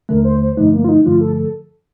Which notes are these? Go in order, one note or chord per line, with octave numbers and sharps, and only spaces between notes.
D#2 D3 A3 A#4
C5
C5
G2 D3 F3 A3 D#4
A#3
F4
D#4
G2 D3 F3 A3 F4
A4
A4